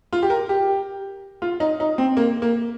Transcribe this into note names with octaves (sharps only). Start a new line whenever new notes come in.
F4
G4
A#4
G4
F4
D#4
D#4
C4
A#3
A#3